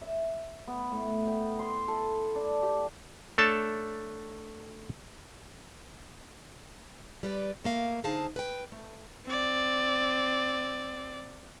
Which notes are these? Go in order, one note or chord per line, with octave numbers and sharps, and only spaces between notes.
E5
B3
A2
G5
C6
A4
D4
G4
A3 D4 A4 C#5 A5
G3 B4 D5
A3 A#3 F5
D3 D#4 G#4 C5 F5 A5
B4 G5
A3
C4 D5